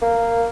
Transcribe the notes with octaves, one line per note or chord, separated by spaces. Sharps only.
A#3